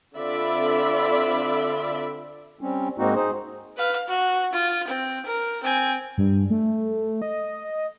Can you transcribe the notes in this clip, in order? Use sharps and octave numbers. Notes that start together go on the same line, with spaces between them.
D3 C4 F4 D5 E5 B5
G3 C4 C#4
G#2 G#3 A#3 C4 D#4 F#4
D#4 G#4 C5
B4 F5
F#4
F4
C4
A#4
C4 G#5
G2
A3
D#5
D#5